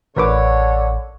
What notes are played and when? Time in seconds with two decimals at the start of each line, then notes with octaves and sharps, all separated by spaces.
0.17 A1 D3 A#4 B4 C#5 D6